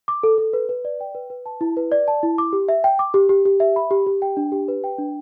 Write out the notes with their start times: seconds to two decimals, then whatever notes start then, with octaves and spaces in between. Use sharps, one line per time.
0.08 D6
0.23 A4
0.38 A4
0.53 B4
0.69 B4
0.85 D5
1.01 G5
1.15 B4
1.30 B4
1.46 A5
1.61 E4
1.77 B4
1.92 D5
2.08 A5
2.23 E4
2.38 D6
2.53 G4
2.68 E5
2.84 G5
2.99 D6
3.14 G4
3.29 G4
3.45 G4
3.60 E5
3.76 B5
3.91 G4
4.07 G4
4.22 G5
4.37 D4
4.52 G4
4.68 B4
4.84 G5
4.98 D4